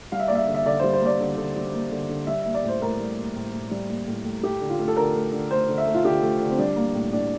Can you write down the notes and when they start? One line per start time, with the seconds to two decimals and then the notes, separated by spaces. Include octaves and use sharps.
0.12 G3 F5
0.20 E5
0.28 A#3 D5
0.35 E5
0.47 D3
0.54 E5
0.66 D3 D5
0.79 G3 C5
0.93 C5
1.01 A#3 D5
1.20 D3
1.37 D3
1.56 G3
1.73 A#3
1.91 D3
2.09 D3
2.27 G3 E5
2.42 A#3 E5
2.54 D5
2.63 A2 C5
2.81 A2 A#4
3.00 G3
3.17 A#3
3.36 A2
3.53 A2
3.71 G3
3.89 A#3
4.08 A2
4.25 A2
4.43 A3 G4
4.61 D3
4.70 F4
4.79 A3
4.88 A4
4.96 D3 A#4
5.15 A3
5.33 D3
5.51 A3 C5
5.69 D3
5.78 E5
5.87 A3
5.95 F4
6.04 D3 G4
6.23 A3
6.40 D3
6.50 C4
6.58 G3 D4
6.76 A#3
6.95 A2
7.13 A2 D4